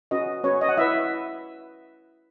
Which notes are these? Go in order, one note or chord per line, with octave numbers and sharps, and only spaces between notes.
C#4 F#4 B4 D#5
C#4 F#4 B4 C#5
D#5
F#5
E4 B4 E5